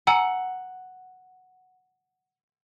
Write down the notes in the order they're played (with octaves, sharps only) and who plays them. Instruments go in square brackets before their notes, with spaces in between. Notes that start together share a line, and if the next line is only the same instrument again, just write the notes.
[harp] F#5 [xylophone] G#5 A#5 E6